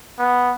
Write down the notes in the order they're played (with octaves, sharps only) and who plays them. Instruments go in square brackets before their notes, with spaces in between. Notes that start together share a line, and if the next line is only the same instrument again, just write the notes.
[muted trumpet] B3